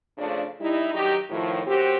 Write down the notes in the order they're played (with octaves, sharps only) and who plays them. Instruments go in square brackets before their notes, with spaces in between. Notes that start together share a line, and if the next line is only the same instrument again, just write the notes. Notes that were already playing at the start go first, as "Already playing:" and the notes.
[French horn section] C#3 F3 A3 D4
G3 D#4 E4
G2 D#3 F#3 D#4 G4
A2 D#3 F3
F#2 C4 F#4 G4